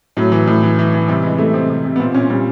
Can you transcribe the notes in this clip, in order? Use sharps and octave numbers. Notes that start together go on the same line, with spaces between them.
A2 F#3
E3
A2
E3
E3
E3
C3 G3
E3 G#3
C3 A3
C3 C4
C3
C3
B3
A#2 C4
A#2 C#4
A#2 G3